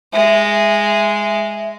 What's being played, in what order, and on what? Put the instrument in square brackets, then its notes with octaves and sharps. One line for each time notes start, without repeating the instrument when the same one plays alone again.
[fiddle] G#3 [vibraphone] E5